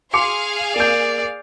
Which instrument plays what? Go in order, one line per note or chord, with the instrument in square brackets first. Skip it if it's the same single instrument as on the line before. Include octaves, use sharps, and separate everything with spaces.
[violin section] G#4 F5 [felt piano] C6 D6 C#7
[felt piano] A#3 G6 [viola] D5